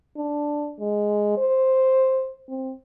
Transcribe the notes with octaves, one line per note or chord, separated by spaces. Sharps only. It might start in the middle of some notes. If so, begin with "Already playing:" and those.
D4
G#3
C5
C4